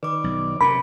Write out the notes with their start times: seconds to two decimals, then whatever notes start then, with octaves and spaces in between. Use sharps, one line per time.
0.03 D#3 B4 D5 D6
0.24 B1
0.61 F#2 C3 A#4 B5